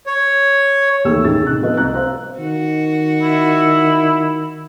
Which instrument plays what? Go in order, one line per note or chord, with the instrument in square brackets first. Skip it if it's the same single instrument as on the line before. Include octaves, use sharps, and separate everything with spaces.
[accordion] C#5
[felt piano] D#2 E3 A3 G4 E6
F#2 A2 D#3 G#4 A6
C3 D#4 F#6
F3 B3 C4 F4 B4 D#5
C2 A#5 F#6
C5 F5
[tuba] D#3 [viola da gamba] F#4
[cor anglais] E4